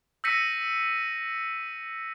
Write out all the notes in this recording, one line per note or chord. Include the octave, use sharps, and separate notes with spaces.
E6 G6 A#6 B6 C#7 D#7